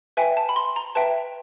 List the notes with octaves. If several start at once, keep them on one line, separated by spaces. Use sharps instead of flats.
B4 E5 G5 G#5
A5
B5
C6
A#5
B4 E5 G5 A5